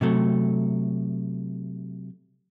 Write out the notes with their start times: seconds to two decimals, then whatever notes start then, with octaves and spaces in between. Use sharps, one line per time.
0.01 C3 F#3 A3